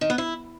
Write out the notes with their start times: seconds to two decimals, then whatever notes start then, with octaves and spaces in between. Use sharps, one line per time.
0.01 D#3
0.10 B3
0.18 E4